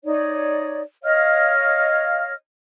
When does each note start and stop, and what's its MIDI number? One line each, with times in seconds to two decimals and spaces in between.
0.05 0.81 63
0.05 0.81 73
0.05 0.81 74
1.03 2.33 73
1.03 2.33 75
1.03 2.33 77
1.03 2.33 89